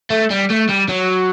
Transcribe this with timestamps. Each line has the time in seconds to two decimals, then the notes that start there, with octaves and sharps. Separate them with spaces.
0.10 A3
0.30 G3
0.50 A3
0.69 G3
0.89 F#3